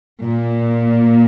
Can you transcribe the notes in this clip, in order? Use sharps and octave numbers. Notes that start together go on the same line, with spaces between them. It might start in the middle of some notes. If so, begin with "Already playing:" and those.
A#2